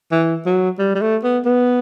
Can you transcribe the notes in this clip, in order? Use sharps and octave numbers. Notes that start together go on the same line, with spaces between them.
E3
F#3
G3
G3
A3
B3
B3